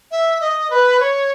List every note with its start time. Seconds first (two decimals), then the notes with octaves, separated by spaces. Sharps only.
0.11 E5
0.41 D#5
0.70 B4
1.00 C#5